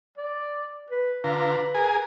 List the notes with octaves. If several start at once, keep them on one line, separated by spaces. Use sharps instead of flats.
D5
B4
D3 F4 B4 A#5
G#4 A#4 G#5